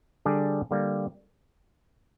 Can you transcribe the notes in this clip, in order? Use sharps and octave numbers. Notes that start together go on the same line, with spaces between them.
D3 G3 D4 G#4 D5
D3 G3 A#3